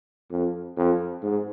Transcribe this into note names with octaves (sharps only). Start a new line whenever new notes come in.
F2
F2
G#2